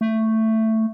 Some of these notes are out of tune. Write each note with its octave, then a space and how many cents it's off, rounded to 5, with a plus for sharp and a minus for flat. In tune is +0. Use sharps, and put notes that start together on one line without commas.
A3 +10